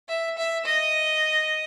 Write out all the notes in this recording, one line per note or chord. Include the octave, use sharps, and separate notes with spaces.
E5
E5
D#5